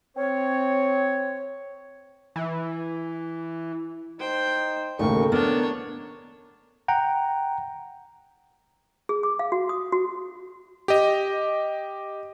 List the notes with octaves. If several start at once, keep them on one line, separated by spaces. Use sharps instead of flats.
C4 C#5
E3
D#4 C5 G5
A1 D#2 C#3 A3 A#4 C#6
B3 D4 C#5 F6
F#5 G5 A#5
G#4
D6
F5
F#4
D#6
F#4
G4 D#5